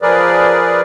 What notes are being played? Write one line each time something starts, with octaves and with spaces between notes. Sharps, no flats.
F3 G#4 A#4 B4 D5